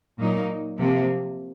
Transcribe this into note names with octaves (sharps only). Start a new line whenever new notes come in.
A#2 F#3 A#3 D#4
C3 F3 A#3